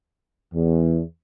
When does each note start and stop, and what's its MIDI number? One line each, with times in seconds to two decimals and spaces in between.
0.54 1.00 40